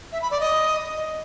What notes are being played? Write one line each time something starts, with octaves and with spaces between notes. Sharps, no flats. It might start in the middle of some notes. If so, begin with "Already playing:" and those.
E5
B5
D5
D#5